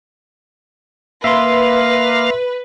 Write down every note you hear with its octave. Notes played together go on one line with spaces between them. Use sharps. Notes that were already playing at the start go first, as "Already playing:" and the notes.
A#3 B4 E5 F5 C6